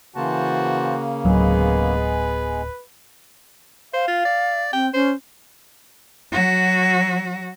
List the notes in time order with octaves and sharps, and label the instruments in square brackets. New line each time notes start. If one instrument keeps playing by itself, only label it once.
[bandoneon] C#3 A#3 [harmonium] E3 C5 A5 [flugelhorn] F#4
[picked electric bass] D1 F#3 [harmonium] G#3 B3 G#4 [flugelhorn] B4
[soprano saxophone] C5 [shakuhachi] F5
[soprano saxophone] F4
D5
[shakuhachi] C4 [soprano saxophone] G5
[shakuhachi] C#4 [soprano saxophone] C5
[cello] F#3 F#4